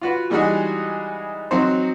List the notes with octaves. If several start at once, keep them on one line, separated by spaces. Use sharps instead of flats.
F4 F#4 B4
E3 G3 G#3 D#4 F#4 G#4
F#3 C4 D#4 F#4 C5